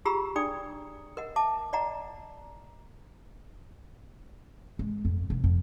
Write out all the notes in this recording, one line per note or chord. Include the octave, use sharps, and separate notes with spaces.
F4 G4 G#4 A#5 B5 E6
D4 G#4 D5 G5 D#6
A#4 D#5 F#5
E5 A5 D6
D5 D#5 F#5 A#5
G#3
F2
E1
F2